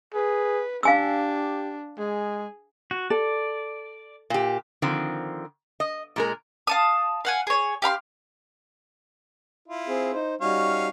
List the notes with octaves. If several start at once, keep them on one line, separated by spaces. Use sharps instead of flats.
G#4 B4
D4 G4 F5 G#5 E6
G#3 G#4
F#4
A4 D5
A#2 G4
D3 D#3 F3 C4
D#5
A#2 G#3 A#4
F5 A5 D#6
F5 F#5 G#5
G#4 C#5
G4 F5 B5 C6
E4 F4
C4 G#4
D#4 C5
G3 C#4 D#4 F#4 C#5 F5